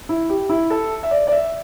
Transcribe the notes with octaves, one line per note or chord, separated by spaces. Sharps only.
E4
G4
E4
A4
E5
D5
D5
E5